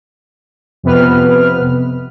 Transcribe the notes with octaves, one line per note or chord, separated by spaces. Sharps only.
F2 C3 B3 B4 F6